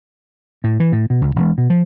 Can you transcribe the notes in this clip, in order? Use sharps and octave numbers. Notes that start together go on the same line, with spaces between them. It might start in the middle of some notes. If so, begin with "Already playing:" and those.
A2
E3
A2
B2
C#2
E1
B2
F3